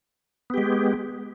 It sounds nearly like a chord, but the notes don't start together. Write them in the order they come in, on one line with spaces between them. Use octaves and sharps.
B3 G4 G#3